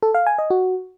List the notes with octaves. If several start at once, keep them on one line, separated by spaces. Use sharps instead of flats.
A4
F5
G#5
D#5
F#4